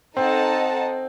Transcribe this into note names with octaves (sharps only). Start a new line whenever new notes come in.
C4 D#4 A4 D#5 F#5 A5